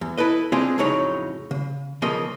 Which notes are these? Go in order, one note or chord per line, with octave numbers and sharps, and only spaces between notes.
E2
E4 A4 B4 D#5
G#3 C4 D4 F4 G#4 F5
F2 A2 C#3 F#3 D#4 C#5
C#3
B1 C#3 F3 A#3 D#5